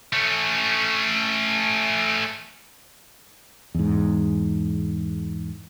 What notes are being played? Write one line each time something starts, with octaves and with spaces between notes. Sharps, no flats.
A3 C#4
E2 G#2